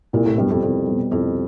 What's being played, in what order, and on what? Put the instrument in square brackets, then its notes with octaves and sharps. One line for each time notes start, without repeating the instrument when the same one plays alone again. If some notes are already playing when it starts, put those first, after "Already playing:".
[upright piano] C2 [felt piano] A#2
[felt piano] A2
[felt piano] G2 [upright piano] B2 G3
[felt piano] F2
[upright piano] C2 [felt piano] F2
[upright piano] B2 G3
[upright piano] C2 [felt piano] F2